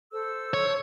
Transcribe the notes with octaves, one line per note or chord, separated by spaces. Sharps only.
A4 C5 E6
C#5